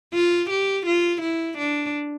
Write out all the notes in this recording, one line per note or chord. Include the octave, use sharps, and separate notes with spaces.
F4
G4
F4
E4
D4